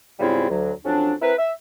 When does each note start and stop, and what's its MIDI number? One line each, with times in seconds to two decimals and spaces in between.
0.20 0.48 44
0.20 0.48 49
0.20 0.48 55
0.20 0.48 60
0.20 0.48 64
0.20 0.48 65
0.50 0.73 38
0.50 0.73 54
0.85 1.13 41
0.85 1.13 54
0.85 1.13 61
0.85 1.13 62
1.22 1.34 60
1.22 1.34 64
1.22 1.34 70
1.22 1.34 71
1.38 1.51 76